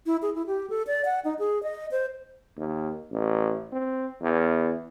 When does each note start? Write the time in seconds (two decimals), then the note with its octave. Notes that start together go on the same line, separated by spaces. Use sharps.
0.06 E4
0.22 G#4
0.35 E4
0.47 G4
0.70 A4
0.87 D5
1.05 F#5
1.25 D#4
1.39 G#4
1.63 D#5
1.91 C5
2.57 D#2
3.11 A1
3.72 C4
4.22 E2